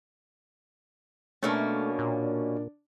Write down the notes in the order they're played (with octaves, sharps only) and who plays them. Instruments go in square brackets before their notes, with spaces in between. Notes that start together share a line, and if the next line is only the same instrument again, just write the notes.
[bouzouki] B2 A#3 C#4 [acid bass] A3 [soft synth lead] D4
[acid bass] A#2